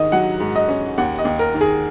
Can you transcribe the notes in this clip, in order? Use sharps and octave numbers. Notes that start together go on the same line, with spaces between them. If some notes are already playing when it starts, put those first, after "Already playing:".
Already playing: G#2 D#3 D#5
F#3 F#5
G#2
D#5
C#4
D#2 F#5
D#5
D#2
A#4
D#3
G#4